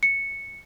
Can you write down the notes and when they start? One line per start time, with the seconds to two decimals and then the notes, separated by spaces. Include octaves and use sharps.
0.03 C#7